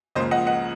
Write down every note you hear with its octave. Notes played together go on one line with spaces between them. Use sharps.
C#2 C#3 F3 A#3 C5 D#5
D#5 F#5
D#5 F#5